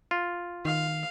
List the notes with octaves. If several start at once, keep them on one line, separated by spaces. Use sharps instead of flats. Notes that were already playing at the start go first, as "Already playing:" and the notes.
F4
D#3 F5